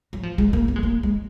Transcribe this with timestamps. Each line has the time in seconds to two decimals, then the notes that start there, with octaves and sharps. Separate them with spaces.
0.13 F#3
0.23 F3
0.38 G#3
0.53 A#3
0.68 B3
0.76 G#3
0.83 A#3
1.03 G#3